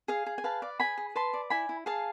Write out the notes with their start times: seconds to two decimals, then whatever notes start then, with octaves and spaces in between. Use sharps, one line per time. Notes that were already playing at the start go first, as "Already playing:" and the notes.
0.08 G#4 F5
0.26 G#4
0.38 G#5
0.44 B4 F5 A5
0.62 D5
0.80 G#4 G#5 B5
0.98 G#4
1.15 B4 A5 C6
1.33 D5
1.50 E4 G#5 B5
1.69 E4
1.86 G#4 F5 A5